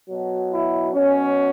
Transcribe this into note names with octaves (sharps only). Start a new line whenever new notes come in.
B2 F#3
E4
B2 F#3 C#4